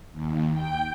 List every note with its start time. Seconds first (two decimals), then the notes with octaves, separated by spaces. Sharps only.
0.12 D#2
0.53 G5